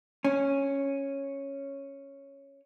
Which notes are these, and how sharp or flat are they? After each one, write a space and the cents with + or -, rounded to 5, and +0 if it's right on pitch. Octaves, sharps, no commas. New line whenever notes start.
C#4 -5